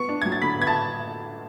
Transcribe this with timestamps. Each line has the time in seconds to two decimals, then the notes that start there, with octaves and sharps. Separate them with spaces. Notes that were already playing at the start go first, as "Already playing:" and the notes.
Already playing: B3 C#6 C#7
0.09 D4
0.22 F#3 G#6
0.32 A6
0.42 D3 B5 B6
0.58 B3 G#6
0.67 A5 A6